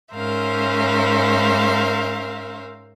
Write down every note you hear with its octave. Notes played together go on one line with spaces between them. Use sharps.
G#2 C#4 A#4 C5 E5 F5